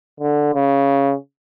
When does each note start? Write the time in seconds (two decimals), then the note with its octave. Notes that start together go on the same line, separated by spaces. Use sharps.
0.20 D3
0.54 C#3